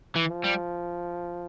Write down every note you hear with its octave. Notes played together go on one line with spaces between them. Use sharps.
E3
F3
G3